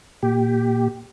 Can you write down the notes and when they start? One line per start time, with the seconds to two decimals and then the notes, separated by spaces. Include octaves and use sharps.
0.23 A#2 G4